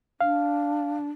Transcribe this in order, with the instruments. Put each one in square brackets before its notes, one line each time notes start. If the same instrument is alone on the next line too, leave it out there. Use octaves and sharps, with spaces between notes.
[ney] D4 [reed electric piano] F5